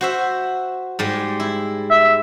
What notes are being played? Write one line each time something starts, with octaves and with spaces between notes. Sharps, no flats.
F#4 C5 E5
G#2 G3 G#3
E4
E5